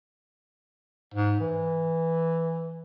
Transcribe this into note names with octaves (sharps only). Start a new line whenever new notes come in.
G#2
E3